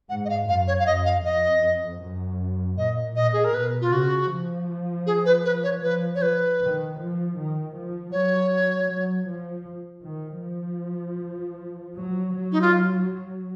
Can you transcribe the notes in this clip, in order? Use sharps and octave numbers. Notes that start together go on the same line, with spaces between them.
G#2 F#5
D#5
F5
F#2 F5
C#5
F5
F#2 D#5
F5
F2 D#5
F#2
A#2 D#5
A#2 D#5
G#4
A#4
B2 B4
F4
C#3 F#4
F3
G#4
B4
B4
C#5
F3 B4
C#5
B4
D#3
F3
D#3
F3
F#3 C#5
F#3
F3
D#3
F3
F#3
F#3
D#4
F4